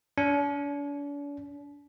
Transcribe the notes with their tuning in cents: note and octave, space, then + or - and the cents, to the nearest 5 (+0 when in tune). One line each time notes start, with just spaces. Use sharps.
D4 -45